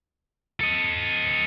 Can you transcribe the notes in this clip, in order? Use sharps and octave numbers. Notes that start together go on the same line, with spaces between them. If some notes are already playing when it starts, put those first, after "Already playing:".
A4 D#5